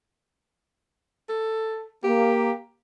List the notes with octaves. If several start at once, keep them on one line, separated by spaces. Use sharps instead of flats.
A4
A#3 G4